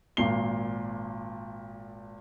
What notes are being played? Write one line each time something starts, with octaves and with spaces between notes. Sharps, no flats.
G#1 A#2 C7 G7